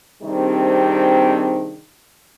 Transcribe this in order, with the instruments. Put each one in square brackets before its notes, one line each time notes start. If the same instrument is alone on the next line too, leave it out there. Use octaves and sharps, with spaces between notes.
[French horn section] C3 D#3 G3 C4 D4 G#4